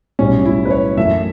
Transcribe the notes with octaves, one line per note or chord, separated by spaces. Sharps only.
B1 A2 G3 C#4
E4
B4
C#5
F#2 E3 A3 E5